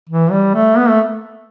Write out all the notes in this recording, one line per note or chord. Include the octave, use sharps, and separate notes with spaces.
E3
G3
A3
B3
A3